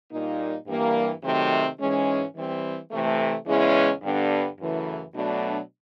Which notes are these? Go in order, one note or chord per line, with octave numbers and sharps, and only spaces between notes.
A#2 G3 A#3 D#4
G2 E3 G3 A#3
C3 D#3 F#3 A3 C4
G#2 E3 G#3 C#4
E3 G3 C4
C3 E3 A3
E2 C#3 E3 G#3 C#4
G2 D3 G3 B3 D4
F#2 C#3 E3 A3
B2 F#3 A3 D4